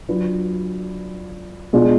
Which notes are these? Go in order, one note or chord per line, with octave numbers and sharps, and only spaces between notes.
F#3 D4 F4 B4
B2 G#3 D4 F4